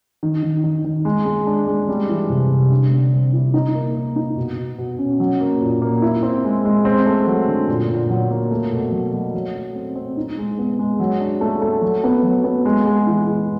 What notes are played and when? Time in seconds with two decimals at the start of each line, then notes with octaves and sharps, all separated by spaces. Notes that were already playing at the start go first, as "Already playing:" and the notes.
0.23 D#3
0.43 D#3
0.64 D#3
0.85 D#3
1.05 G#3
1.25 G#3
1.47 D4
1.67 G#3
1.89 G3
2.09 E3
2.29 C3
2.51 C3
2.71 D3
2.91 G3
3.13 C4
3.33 E4
3.54 D#4
3.75 A#3
3.95 A#3
4.16 D#4
4.37 B2
4.58 B2
4.78 B2
4.99 C#4
5.20 F#3
5.40 A#3
5.61 A#2
5.82 A#3
6.02 E4
6.23 C4
6.44 G#3
6.65 G#3
6.85 C4
7.06 A3
7.27 F#3
7.48 D3
7.69 A#2
7.89 A#2
8.10 F#3
8.30 A#3
8.51 A3
8.72 B2
8.92 F#3
9.13 F#3
9.34 F#3
9.55 A3
9.75 C4
9.96 C4
10.17 D#4
10.38 G#3
10.58 B3
10.79 G#3
11.00 F#3
11.20 D4
11.41 A3
11.62 A3
11.82 F#3
12.04 B3
12.24 F#3
12.44 B3
12.65 G#3
12.85 G#3
13.07 E3
13.28 G#3